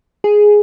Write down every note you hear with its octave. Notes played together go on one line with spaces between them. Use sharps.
G#4